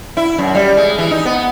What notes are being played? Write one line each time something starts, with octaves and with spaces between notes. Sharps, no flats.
E4
F#2
G3
G#3
E3
D#4
B3